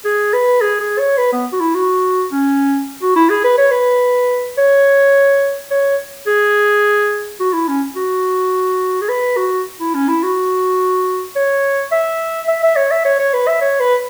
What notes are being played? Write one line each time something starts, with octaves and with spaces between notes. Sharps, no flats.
G#4
B4
G#4
G#4
C#5
B4
B3
F#4
E4
F#4
C#4
F#4
E4
G#4
B4
C#5
B4
C#5
C#5
G#4
F#4
E4
C#4
F#4
G#4
B4
F#4
E4
C#4
E4
F#4
C#5
E5
E5
E5
C#5
E5
C#5
C#5
B4
E5
C#5
B4